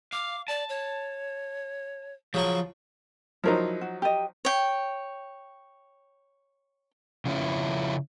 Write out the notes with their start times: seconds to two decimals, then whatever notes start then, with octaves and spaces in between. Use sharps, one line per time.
0.13 F5 D6
0.48 D5 A5
0.69 C#5
2.34 C#3 F3 F#3 C#6
3.44 F3 F#3 D#4 E4 A#4 C5
3.81 F#4
4.02 G4 D#5
4.45 C#5 G5
7.26 C#3 F3 C#4 E4